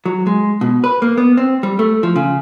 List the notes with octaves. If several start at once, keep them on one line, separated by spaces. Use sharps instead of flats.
F#3
G#3
B2
B4
A#3
B3
C4
G3
A3
F3
C#3